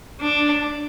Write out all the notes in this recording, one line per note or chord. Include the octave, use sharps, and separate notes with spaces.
D4